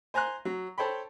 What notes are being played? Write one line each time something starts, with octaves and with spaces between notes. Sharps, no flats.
C5 G#5 A#5 C6 F#6
F#3
A4 C5 C#5 G5 B5